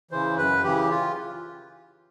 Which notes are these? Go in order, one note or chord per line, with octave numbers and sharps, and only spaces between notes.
C#3 E3 C5
F#2 B4
C#3 E3 G4
F4